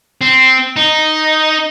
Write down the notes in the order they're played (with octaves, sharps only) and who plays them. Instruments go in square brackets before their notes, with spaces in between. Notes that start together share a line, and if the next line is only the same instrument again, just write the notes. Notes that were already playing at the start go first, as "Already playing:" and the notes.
[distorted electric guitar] C4
D#4